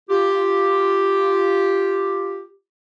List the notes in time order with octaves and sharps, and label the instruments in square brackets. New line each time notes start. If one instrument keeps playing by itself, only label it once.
[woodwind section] F4 G4